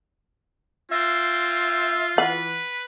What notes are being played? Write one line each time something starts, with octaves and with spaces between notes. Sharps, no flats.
C4 F4 E5
E3 B4 F#5